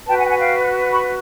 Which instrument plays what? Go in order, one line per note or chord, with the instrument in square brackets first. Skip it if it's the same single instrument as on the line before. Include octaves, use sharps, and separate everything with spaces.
[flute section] F#4 B4 G5 A5
F#5 G#5
G5
F#5 G#5
F5 G5
B5 C#6